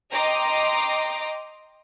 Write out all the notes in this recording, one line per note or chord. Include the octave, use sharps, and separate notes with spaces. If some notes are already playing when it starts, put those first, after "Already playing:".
D#5 G5 A#5 C6 D6